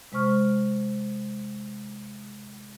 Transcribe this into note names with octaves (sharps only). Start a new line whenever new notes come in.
C3 G#3 C5 C#6 F6